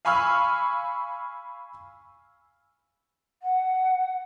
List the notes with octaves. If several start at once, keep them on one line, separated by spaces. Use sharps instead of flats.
F5 G#5 B5 C#6 E6 F6
F#5